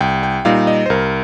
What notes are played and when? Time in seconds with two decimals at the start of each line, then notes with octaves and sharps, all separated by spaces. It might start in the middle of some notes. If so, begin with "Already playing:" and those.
0.01 C2 G5
0.23 G5
0.45 A#2 G3 D#4 F5
0.67 D#5
0.86 C5
0.90 C2 A#4